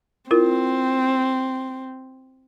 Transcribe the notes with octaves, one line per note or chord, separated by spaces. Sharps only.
C4 E4 F4 A#4